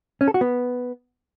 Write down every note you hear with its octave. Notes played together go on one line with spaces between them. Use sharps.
C#4
A4
F#4
B3